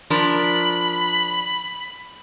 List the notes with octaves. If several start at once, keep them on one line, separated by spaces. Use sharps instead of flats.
F3 D4 A#4 B5